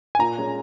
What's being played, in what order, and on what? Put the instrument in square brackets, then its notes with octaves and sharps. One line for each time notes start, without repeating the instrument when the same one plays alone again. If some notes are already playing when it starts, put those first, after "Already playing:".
[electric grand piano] G#5
[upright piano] A#2 [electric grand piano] A#5
[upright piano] G#3 C#4